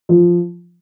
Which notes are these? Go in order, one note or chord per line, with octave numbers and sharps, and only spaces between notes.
F3